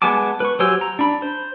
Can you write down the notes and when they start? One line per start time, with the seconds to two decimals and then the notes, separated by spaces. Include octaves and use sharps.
0.02 G#3 B3 G#5 A5 D6
0.40 B4 C#6
0.59 F#3 G4 C5 G#5 E6
0.81 A#5
0.99 D4 B5
1.22 C5